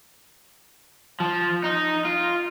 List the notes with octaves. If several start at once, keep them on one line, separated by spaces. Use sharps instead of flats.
F3
D#4
F4